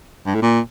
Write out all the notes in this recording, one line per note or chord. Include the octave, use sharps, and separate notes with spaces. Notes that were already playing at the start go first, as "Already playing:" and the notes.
G2
A2
A#2